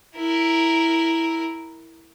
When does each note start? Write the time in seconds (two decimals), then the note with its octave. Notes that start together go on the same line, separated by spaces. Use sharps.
0.17 E4 A#4